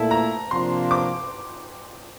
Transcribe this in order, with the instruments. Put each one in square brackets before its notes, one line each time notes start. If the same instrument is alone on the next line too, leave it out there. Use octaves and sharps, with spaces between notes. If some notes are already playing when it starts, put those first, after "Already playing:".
Already playing: [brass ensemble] A#2 A3 E4 [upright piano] A5
[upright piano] A#5
[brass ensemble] C3 F3 A#3 D4 [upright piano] C6
[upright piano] D6